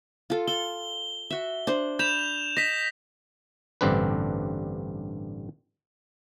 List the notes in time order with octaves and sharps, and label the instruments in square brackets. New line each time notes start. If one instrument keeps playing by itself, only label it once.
[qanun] F4 A4
[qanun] A4 [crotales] G7
[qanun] F#4 E5
D4 C5
[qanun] B5 [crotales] G6 E7 F7
[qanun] D#5 [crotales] A#6 B6
[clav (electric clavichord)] A1 G2 D3 C4 D4 B4